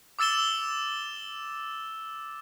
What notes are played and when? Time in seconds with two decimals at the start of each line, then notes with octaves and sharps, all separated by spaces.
0.19 D6 E6 A6 E7 G7